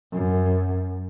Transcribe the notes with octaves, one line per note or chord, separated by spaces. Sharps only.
F#2